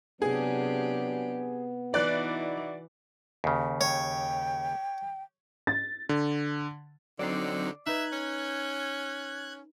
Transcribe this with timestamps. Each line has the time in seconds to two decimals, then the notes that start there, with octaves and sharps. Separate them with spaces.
0.22 C3 F#3 B3 D4 G4 G#4
1.94 E3 D#4 E4 F#4 D5 F#6
3.44 D#2 C#3
3.81 C#5 G5
5.67 A6
6.09 D3
7.19 D3 F#3 C4 D#4 D5 C7
7.86 D#4 B4 E5 F#6 G#6
8.13 C#4